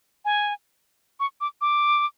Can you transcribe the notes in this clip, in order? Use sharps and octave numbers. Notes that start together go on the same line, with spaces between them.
G#5
C#6
D6
D6